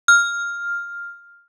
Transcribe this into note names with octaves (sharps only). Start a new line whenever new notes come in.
F6